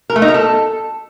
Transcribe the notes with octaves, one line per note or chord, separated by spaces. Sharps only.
A#4
A3
D#4
A#4
A4